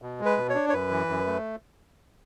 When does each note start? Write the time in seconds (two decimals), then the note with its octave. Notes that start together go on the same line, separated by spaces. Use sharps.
0.02 B2
0.20 G#3
0.26 B4
0.38 B2
0.49 C#5
0.55 D4
0.70 C#5
0.73 F#2 B4
0.91 E3
1.09 F#2
1.27 A3